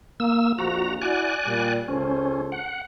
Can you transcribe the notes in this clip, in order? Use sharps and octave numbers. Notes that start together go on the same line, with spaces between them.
A#3 E6
A#1 F2 F3 F#4 A#5
E4 F#4 D5 G#5 F#6
A#2 G3
C#2 C#4 A4 C5
F#5